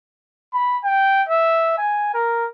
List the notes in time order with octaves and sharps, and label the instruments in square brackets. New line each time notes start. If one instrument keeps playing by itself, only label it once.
[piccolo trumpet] B5
G5
E5
G#5
A#4